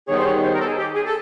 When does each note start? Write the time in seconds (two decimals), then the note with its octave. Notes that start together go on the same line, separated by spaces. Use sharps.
0.08 D#3 G3 B3 D#4 G#4 C#5
0.17 C5
0.26 C#5
0.44 C5
0.55 A#4
0.61 A4
0.67 G#4
0.78 G4
0.96 G#4
1.06 A4